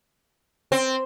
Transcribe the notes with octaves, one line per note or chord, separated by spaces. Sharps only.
C4